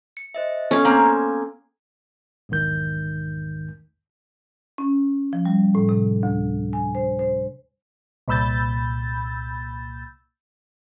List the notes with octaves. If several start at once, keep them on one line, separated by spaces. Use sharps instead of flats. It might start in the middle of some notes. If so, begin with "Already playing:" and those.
C#7
C5 D#5 E5
B3 C#4 A4 F5 G#6
A#3 C4 A#5
B1 E2 G#2 D#3 G6
C#4
F3
G3
A2
C3
D2
G#5
C5
C5
C2 A#2 B5 E6 G6 A6